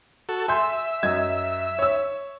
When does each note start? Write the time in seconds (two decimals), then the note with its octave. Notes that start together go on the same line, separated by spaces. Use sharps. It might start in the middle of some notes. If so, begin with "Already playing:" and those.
0.29 F#4 A4
0.48 E5 G#5 C6 G6
1.03 F#2 D#5 G#6
1.79 C#5 E6